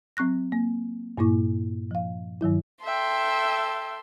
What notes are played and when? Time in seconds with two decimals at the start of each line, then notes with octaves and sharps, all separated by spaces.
0.17 F#3 C4 C#6 F#6 A#6
0.52 A#3
1.18 G2 A#2 A#3 E4 C#6
1.91 F3 F5
2.41 G2 D#3 F#3 E4
2.85 A4 E5 G5 C6